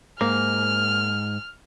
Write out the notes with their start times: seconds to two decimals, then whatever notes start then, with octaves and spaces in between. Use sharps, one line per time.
0.21 G#2 A#3 F6